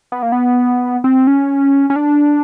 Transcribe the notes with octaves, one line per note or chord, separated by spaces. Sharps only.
B3
A#3
B3
C4
C#4
C#4
D4